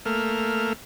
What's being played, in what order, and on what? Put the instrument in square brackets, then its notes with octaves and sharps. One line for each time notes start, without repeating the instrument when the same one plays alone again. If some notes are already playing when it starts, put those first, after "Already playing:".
[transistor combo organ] A3 A#3 F6